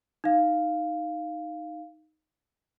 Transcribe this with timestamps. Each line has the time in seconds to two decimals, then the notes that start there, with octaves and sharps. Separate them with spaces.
0.24 D#4 F5